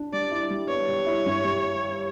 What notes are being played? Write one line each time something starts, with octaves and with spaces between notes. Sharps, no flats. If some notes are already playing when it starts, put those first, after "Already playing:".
Already playing: D4
G3 D5
E4
G3
B3 C#5
G3
E4
G2
G3